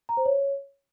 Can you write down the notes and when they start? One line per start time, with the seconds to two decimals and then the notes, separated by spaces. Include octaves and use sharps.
0.09 A#5
0.17 C5
0.25 C#5